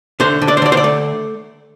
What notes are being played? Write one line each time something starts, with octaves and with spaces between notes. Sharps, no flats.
D3 C5
D3
D5
C5
D3 D5
C5
D5
A3